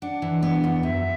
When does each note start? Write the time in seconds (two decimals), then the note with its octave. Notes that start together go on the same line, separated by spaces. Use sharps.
0.02 D4 F#5
0.22 E3
0.42 B3
0.64 E2
0.83 F#2 E5